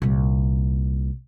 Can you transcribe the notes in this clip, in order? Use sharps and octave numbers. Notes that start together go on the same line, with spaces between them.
C2 A#2